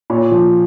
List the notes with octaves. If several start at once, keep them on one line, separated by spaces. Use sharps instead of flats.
A#2 C#5
F3